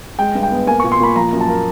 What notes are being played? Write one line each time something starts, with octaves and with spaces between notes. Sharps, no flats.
G#3 G5
G2
G5
B3
A#3 G#5
C#6
A#2
C6
A#2 B5
F3 A#5
F#2
A5
A#3